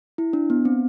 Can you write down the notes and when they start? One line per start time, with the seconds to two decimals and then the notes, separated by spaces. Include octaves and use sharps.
0.18 E4
0.33 D4
0.50 B3
0.65 C4